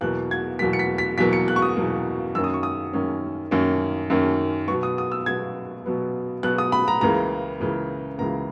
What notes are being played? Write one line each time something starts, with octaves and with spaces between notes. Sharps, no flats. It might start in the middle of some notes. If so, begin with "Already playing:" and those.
E2 B2 F#3 A#3 F#6
G#6
E2 B2 F#3 A#3 B6
C#7
B6
B6
E2 B2 F#3 A#3 B6
C#7
F#6
C#6
D#6
E2 B2 F#3 A#3
F#2 D#3 A#3 C#4 E6
D#6
C#6
D#6
F#2 D#3 A#3 C#4
F#2 D#3 A#3 C#4
F#2 D#3 A#3 C#4
B2 F#3 B3 C#6
D#6
D#6
E6
B2 F#3 B3 G#6
B2 F#3 B3
B2 F#3 B3 F#6
D#6
B5
A#5
C#2 C#3 E3 A#3 A#5
C#2 C#3 E3 A#3
C#2 C#3 E3 A#3 A#5